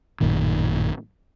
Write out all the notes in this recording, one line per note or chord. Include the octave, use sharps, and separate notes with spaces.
A1 F#2 A#2 D#3